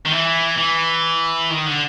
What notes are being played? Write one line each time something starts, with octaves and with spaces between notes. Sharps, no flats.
D#3
E3
E3
D#3
D3